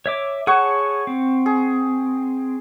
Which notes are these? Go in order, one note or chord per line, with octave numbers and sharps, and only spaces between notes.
C#5 E5 D6
G#4 C#5 F#5 A5 C#6
C4
G#4